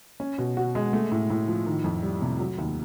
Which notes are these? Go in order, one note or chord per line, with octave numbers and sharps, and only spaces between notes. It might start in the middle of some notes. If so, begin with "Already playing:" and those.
C#4
B2
F#4
G#3
A3
A2
A2
F3
D#3
F2
G3
C3
F#3
D#2